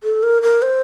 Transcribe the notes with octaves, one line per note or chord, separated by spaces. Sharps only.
A4
A#4
A#4
C5